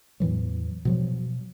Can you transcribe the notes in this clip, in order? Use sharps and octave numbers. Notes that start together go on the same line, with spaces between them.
E2 A2 E3 F#3
B2 F3 F#3